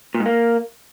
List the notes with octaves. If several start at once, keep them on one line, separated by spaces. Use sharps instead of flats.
A#2
G#2
A#3